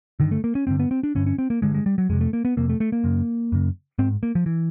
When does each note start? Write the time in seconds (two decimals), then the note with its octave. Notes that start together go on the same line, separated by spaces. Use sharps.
0.20 G2 D3 D#3
0.31 A3
0.44 A#3
0.55 C#4
0.67 G2 D3 C4
0.80 B3
0.91 C4
1.03 D4
1.15 G2 D3 C#4
1.26 C#4
1.38 C4
1.50 A#3
1.62 G2 D3 G#3
1.75 G#3
1.86 G3
1.98 F#3
2.09 F2 G#3
2.13 C3
2.21 A3
2.33 A#3
2.45 B3
2.57 F2 C3 A#3
2.69 A3
2.80 A3
2.92 A#3
3.04 F#2 C#3
3.52 F#2 C#3
3.99 G#2 C4
4.23 A#3
4.35 F3
4.46 E3